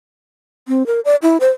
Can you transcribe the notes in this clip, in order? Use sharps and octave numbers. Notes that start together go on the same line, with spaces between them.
C4
A#4
D5
E4
C5